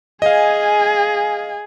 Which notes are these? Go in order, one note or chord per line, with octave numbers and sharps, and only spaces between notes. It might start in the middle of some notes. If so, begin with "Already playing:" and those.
G#4 D#5 F5 G#5